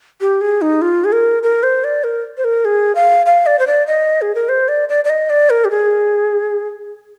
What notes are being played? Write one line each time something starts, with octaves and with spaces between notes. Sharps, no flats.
G4
G#4
D#4
F4
G#4
A#4
A#4
C5
D5
A#4
C5
A#4
G#4
F5
F5
D5
C5
D5
D#5
G#4
A#4
C5
D5
D5
D5
D#5
D5
A#4
G4
G#4